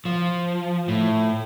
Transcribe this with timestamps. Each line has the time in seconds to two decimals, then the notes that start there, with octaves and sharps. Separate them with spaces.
0.05 F3
0.88 A2